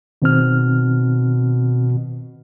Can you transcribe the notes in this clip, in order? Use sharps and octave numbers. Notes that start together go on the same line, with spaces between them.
B2 D#3 C4 F6